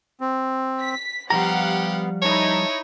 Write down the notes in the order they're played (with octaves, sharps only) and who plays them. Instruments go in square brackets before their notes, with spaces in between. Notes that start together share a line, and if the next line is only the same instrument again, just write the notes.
[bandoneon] C4
[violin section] B6
[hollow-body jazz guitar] F3 G3 A#5 [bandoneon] B3 [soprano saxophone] G4 [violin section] F5 F#5
[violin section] D#4 E4 [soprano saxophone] C#5 [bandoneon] A5